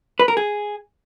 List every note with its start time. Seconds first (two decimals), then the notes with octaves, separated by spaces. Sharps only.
0.19 B4
0.28 A#4
0.37 G#4